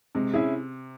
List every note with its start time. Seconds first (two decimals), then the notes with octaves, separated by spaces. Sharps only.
0.15 C3 G#3
0.33 C#4 E4 G#4